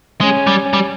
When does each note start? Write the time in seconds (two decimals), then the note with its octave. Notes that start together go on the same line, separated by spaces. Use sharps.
0.21 G#3 C#4
0.47 G3
0.73 G3